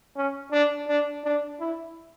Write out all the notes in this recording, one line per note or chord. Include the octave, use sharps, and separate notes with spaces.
C#4
D4
D4
D4
E4